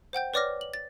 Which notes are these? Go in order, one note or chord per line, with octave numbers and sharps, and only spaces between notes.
C5 F#5 G5 G6
B4 C#5 D5 D6 F6 A#6
F#7
A6